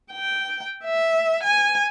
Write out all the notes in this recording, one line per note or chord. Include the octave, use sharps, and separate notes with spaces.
G5
E5
G#5